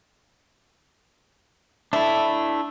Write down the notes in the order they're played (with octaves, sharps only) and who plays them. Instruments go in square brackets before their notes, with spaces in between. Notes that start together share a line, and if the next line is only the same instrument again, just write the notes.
[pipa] A3 [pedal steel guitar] D4 E4